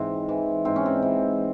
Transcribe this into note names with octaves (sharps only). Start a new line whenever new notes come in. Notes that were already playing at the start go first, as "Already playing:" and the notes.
Already playing: G#2 E3 C4
E3
G#2 C4
C#4
C4
E3